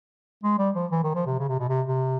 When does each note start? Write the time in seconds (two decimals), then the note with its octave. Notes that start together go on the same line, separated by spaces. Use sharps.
0.43 G#3
0.58 G3
0.75 F3
0.91 E3
1.03 D#3
1.15 F3
1.26 C3
1.39 C#3
1.48 C3
1.59 B2
1.69 C3
1.87 C3